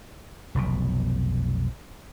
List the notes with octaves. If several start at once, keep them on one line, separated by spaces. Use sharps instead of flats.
F1 B1 B2